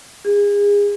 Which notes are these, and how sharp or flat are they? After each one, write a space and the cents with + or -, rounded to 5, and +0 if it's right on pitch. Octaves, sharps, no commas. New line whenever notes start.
G#4 -30